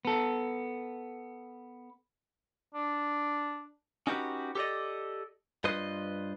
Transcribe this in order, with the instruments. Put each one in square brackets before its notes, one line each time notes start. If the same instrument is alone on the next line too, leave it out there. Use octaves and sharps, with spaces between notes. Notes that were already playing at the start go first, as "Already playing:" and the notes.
[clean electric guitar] B3 A4
[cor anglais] D4
[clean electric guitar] C#4 D#4 F#4 G4 B4
G4 A4 C5 D5 D#5
G2 F4 B4 C5 D#5